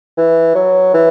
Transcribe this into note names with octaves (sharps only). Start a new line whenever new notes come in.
E3
F#3
E3